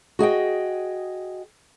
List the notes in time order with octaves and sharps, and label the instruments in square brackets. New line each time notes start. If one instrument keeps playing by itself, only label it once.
[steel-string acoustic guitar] F#4 G#4 D#5 G5